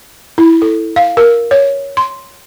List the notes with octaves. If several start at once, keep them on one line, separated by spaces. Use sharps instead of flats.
E4
A4
F5
A#4
C#5
C6